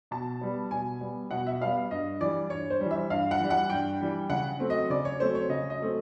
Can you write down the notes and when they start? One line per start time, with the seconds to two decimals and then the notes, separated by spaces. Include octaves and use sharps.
0.11 B2 A5
0.41 G3 B3
0.71 B2 G#5
1.01 G3 B3
1.31 B2 F#5
1.47 E5
1.61 G3 B3 F5
1.91 G2 D#5
2.21 E3 G3 D5
2.50 G2 C#5
2.70 C5
2.80 G3
2.86 E3
2.91 E5
3.10 G2 F5
3.31 F#5
3.40 E3 G3
3.50 F#5
3.70 G2 G5
4.01 E3 G3
4.30 C#3 F#5
4.60 F#3 A3 C4
4.70 D#5
4.90 C#3 D5
5.05 C#5
5.20 F#3 A3 C4 C5
5.35 C#5
5.49 C#3 D#5
5.70 D#5
5.79 F#3 A3 C4